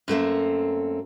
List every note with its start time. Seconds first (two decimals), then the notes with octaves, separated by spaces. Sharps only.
0.08 F#2 A3 A#3 C4